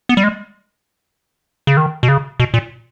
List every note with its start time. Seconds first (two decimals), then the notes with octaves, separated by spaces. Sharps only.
0.09 B3
0.17 G3
0.24 G#3
1.67 C#3
1.77 D#3
2.03 B2
2.08 C#3
2.40 B2
2.54 A#2